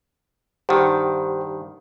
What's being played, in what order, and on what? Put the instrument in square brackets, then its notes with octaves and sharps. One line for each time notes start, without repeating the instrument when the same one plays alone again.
[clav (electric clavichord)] G2 D#3 [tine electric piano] G4 C5 F#5